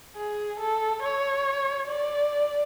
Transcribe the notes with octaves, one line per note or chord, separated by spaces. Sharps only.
G#4
A4
C#5
D5